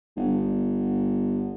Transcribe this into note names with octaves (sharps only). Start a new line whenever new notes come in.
G1